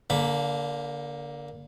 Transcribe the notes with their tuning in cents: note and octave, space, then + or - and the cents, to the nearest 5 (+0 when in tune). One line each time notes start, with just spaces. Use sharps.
D3 -25 A#3 +10 B5 +5